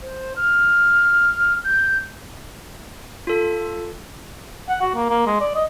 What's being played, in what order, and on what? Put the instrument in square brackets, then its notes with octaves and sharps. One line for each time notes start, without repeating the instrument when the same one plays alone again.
[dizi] C5
F6
G6
[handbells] F4 A4
[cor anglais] F#5
F#4
A#3
A#3
G#3
D5
D#5